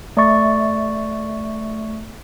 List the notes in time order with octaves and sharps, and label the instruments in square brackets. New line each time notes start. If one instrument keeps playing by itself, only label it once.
[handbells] A3 D5 E5 C#6 A6